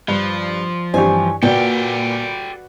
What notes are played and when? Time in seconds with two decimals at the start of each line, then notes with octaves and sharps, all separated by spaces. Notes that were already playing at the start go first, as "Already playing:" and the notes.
0.08 G2 F3 B4
0.94 G2 E3 C4 D4 G4 C#5 G#5
1.43 A#2 F#4 G4 A4 B4 D5 G5